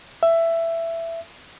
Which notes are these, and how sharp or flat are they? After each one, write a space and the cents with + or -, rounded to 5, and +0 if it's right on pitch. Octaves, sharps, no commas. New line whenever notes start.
E5 +10